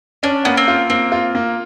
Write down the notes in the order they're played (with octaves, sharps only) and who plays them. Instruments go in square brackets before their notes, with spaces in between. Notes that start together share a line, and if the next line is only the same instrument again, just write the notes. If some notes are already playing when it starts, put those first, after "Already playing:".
[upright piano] C#4 [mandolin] D4
[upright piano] A#3 [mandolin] B3
[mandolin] C4
[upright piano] F4
[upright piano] A#3 [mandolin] C4
[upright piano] F4
A#3